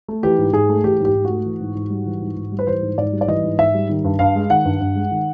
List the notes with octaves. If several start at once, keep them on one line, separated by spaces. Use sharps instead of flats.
A3
E3 G4
G#2
G#2 G#4
A3
E3 G4
G#2
G4
G#2
A3 F#4
E3
G#2
G#2
G3
E3
G#2
G#2
G3
B4
E3 C5
G#2
G#2 D5
G3
D5
E3 D#5
G#2
G#2 E5
G3
D#3
G2
G2 F5
G#3
D#3 F#5
G2
G2
G#3
D#3